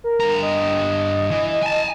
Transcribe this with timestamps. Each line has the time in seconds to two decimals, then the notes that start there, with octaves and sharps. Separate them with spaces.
0.04 A#4
0.20 G2 A#5
0.42 D#5
1.31 E3
1.62 G#5 A5